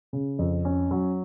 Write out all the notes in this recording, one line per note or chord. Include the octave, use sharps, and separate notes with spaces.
C#3
F2
C#4
F#3